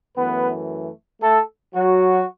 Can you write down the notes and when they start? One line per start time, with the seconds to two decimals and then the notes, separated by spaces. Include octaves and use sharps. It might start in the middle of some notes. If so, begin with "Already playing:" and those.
0.15 F#2 E3 A3 B3 B4
1.21 A3 A4
1.74 F#3 F#4